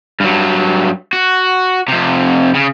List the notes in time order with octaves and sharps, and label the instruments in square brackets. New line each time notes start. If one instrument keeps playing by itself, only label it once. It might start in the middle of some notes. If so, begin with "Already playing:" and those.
[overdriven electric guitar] G2 F#3
F#4
F2 C3
C#3